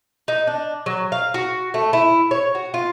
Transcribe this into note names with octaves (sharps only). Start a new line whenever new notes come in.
D#4
D4
F#3
F5
F#4
A3
E4
C#5
F#4
F4